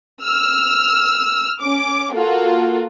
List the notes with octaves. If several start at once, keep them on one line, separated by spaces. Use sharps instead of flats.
E6 F6
C#4 D6
A#3 F4 F#4 A4